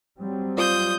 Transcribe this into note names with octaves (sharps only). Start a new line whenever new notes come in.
F#3 G3 C4
F4 C5 D5 D#6 G6